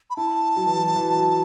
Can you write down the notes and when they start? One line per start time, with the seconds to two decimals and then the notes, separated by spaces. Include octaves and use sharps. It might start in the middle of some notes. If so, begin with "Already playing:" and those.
0.10 B5
0.17 E4 A5
0.56 F#3
0.67 E3
0.77 F#3
0.88 F#3
0.96 E3
1.16 F#3